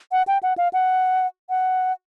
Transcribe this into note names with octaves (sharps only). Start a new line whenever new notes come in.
F#5
G5
F#5
F5
F#5
F#5